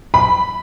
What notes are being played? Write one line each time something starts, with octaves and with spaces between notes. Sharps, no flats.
B5